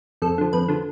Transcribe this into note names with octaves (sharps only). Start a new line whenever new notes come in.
F2 A4
D3 F3
F2 B4
D3 F3